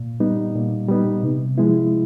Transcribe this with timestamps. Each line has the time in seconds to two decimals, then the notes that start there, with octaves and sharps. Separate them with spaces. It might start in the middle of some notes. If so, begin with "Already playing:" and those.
Already playing: A#2
0.20 G3 B3 D#4
0.55 A#2
0.89 G3 B3 D#4
1.23 C3
1.58 F3 G#3 B3 E4